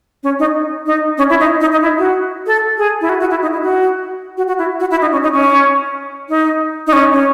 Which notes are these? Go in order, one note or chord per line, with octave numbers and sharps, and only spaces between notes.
C#4
D#4
D#4
C#4
E4
D#4
D#4
D#4
E4
F#4
A4
G#4
E4
F#4
F#4
E4
D#4
E4
F#4
F#4
F#4
E4
F#4
E4
D#4
C#4
D#4
C#4
D#4
D#4
C#4
C#4